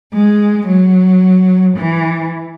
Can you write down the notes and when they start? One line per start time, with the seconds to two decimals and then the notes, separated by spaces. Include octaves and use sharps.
0.12 G#3
0.67 F#3
1.77 E3